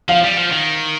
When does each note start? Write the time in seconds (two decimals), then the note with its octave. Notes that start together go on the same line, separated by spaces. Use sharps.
0.09 F3 F5
0.24 G3
0.37 F3
0.52 D#3